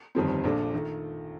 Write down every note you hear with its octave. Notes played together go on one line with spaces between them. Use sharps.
G1 F2 D#3 G3 C4
A#1 A#2 A3 D4
D#3 A3